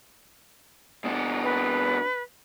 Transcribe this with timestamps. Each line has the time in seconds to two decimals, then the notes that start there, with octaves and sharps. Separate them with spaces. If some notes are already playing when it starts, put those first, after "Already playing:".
1.05 B2 D4
1.43 B4